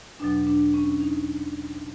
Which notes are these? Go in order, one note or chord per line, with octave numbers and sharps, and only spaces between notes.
E2 B2 F#3 D4
D4
C#4
D#4